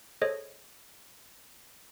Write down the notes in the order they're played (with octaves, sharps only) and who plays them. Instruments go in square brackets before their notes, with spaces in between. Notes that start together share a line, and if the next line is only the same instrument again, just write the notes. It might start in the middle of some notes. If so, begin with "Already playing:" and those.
[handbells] G#4 A4 C5 C#5 D#5